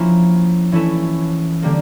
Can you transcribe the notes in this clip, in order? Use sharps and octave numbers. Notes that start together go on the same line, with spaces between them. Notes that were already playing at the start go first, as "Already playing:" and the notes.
Already playing: F3 A#3 C#4 E4
E3 A3 C#4 E4
D3 G3 A#3